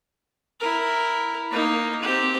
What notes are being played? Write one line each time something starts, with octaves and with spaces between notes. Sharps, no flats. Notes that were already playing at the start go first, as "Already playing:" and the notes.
E4 A#4
A#3 D#4
C4 G4